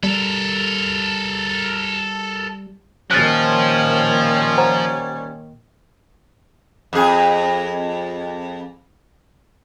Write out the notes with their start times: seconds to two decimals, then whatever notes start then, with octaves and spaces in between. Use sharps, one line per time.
0.03 G3 A4 A#4
3.11 A#2 D#3 F3 G3 C#4 C#5 F#6 A6
4.58 C5 F#5 A#5
6.93 F2 G#4